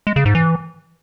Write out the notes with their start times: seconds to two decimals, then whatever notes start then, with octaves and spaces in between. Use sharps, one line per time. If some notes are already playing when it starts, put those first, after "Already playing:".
0.07 G#3
0.16 C#3
0.25 G#2
0.35 E3